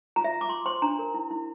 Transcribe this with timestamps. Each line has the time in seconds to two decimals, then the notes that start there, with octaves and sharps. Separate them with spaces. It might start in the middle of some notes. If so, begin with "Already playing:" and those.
0.16 F4 A#5
0.24 E5
0.33 F4
0.41 D6
0.49 F4 C6
0.66 C5 C6
0.82 D4 A#5
0.99 A#4
1.14 E4
1.31 E4